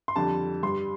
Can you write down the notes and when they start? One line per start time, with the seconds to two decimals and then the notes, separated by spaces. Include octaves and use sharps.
0.08 C6
0.16 F2 D3 G3 A5
0.63 G2 G3 C6